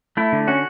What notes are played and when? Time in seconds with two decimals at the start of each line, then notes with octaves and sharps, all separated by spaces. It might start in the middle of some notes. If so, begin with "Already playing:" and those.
0.17 A3 E4
0.32 D3
0.47 C#4 F#4